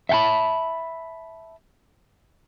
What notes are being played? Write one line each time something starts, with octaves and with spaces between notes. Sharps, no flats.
E5 F5 G5 A5 B5